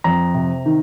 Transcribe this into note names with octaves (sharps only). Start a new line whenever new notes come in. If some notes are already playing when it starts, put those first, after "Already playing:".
F2 A#5
C3
D#3